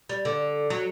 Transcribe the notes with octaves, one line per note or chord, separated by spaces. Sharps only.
G3
D3
F#3